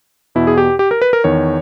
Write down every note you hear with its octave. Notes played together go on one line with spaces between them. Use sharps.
E2 B2 E4
G#4
G4
G4
A#4
B4
A#4
E2 D#3 C#5